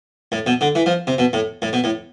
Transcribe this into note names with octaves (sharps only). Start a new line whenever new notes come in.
A2
B2
D3
E3
F3
C3
B2
A2
A2
B2
A2